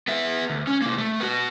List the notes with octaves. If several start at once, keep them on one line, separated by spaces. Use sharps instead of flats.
B3 E5
D2
C#4
C3 A#3
A3
B3 F#4